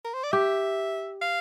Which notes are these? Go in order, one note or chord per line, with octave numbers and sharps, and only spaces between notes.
A#4
C5
D5
G4 E5
F5